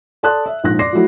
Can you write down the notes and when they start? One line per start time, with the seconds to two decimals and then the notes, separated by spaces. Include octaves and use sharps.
0.23 A4 D5 A5 C6 D#6 F#6
0.46 E5
0.64 A#1 G#2 F4 F#6 A#6
0.79 D5 C6 D6 A#6 C7
0.93 F3 F#3 A3 E4 F#4